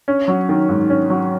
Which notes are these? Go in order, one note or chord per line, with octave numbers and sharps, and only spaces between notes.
C#4
F#3
D#3
G#2
C#4
F#3